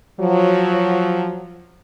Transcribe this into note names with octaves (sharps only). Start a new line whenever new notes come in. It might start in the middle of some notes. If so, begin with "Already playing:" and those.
F3 F#3